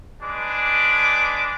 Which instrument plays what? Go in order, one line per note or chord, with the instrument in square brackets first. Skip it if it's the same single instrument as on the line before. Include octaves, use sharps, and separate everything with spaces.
[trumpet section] G#3 D4 B4 D6